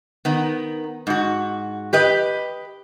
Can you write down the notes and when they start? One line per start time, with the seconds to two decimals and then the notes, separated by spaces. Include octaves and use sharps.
0.25 D#3 B3
1.07 G#2 F#4
1.93 G4 B4 D#5